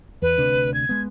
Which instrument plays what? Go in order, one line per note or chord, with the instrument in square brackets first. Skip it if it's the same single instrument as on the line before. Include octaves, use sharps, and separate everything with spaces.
[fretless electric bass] E2 [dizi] B4
[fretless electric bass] D2 C3 D4
[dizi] G#6
[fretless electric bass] G#3 B3